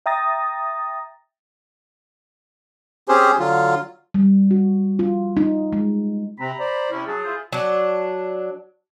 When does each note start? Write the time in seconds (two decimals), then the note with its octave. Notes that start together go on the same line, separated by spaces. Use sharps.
0.06 E5 G5 A#5 D#6 A6 A#6
3.08 C4 C#4 G4 G#4 C5
3.39 D3 F#3 F4
4.14 G3
4.51 F#4
4.99 F4
5.37 D#4
5.73 G#3
6.40 C3 C4 A#5 B5
6.60 C5 D5
6.91 C3 C#4 E4
7.07 F#3 G#4 A5
7.25 E4 F4 C5
7.52 F#3 D4